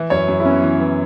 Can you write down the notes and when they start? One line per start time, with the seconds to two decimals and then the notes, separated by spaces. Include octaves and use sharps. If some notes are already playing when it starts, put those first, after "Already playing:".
Already playing: E3 E4
0.10 F#2 C#5
0.28 F#2
0.40 E4
0.45 B3 C#4
0.62 E3
0.80 E3